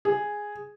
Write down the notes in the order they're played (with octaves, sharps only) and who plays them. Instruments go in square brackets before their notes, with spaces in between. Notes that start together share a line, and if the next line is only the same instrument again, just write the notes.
[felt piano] G#4